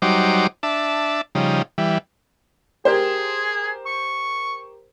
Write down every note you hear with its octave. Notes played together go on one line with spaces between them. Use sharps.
F#3 G3 D#4 C5 D6
D4 E5 A5
C#3 F3 G3 D#4
E3 G3
G4 G#4 A#4 C5
C#6